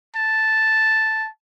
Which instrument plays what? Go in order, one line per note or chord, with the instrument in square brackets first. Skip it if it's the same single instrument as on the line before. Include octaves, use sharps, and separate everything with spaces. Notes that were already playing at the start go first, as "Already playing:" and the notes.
[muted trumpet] A5